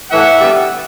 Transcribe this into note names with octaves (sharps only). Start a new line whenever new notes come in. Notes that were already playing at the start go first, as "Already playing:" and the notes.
A2 E3 A3 E5 F#5
D3 G3 B3